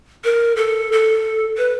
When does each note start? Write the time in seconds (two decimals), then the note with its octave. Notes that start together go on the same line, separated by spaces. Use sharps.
0.24 A#4
0.56 A4
0.92 A4
1.57 B4